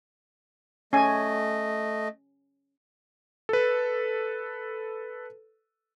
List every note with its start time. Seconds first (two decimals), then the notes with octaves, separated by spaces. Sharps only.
0.93 A3 C#4 D#5 G#5
3.49 A4 B4